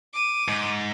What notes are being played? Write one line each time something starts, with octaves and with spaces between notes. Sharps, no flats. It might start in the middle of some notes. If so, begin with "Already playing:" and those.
D6 D#7
G#2